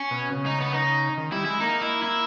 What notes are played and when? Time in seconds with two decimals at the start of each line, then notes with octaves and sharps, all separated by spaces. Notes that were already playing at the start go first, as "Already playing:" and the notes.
Already playing: C#4
0.11 B2
0.32 C#3
0.46 D#4
0.60 B3
0.74 D#4
1.17 D#3
1.32 G3 E4
1.45 G#3 E4
1.61 A#3 D#4
1.82 E4
2.03 E4